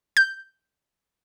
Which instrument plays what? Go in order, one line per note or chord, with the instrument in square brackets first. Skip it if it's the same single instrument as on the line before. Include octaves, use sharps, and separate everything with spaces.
[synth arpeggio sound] G6